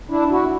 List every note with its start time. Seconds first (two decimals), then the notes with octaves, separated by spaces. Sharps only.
0.10 D4 E4
0.30 E4 F#4